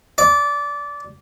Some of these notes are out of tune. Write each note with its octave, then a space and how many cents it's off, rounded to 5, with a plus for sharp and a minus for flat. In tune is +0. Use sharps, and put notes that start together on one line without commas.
D5 -20